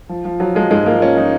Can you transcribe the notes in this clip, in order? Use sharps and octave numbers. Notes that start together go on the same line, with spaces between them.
F3
F3
F3 F#3
F3 G#3
G#2 G#3
F3 A#3
F3 C#4
F3 D#4